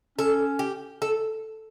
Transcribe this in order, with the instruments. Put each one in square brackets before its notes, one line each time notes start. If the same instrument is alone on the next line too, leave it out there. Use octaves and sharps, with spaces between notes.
[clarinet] C#4 [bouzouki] A4
[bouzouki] G4
A4